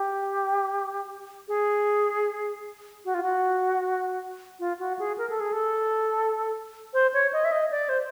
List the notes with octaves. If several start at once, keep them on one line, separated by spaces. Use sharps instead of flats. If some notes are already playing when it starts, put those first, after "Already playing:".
Already playing: G4
G#4
F#4
F4
F#4
F4
F#4
G#4
A#4
A4
G#4
A4
C5
C#5
D#5
E5
D#5
D5
C5